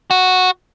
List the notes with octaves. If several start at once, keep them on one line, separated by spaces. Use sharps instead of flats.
F#4